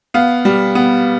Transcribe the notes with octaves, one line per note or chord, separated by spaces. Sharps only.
B3 F5
G3
B3